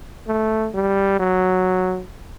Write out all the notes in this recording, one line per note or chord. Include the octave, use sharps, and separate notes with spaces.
A3
G3
F#3